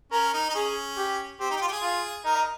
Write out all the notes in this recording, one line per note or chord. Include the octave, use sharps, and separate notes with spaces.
C#4 A#4
D#4
D#4
C#4 G#4
G4
C4 G4
D#4
G4
F4
G4
G#4
F4
D#4 A#4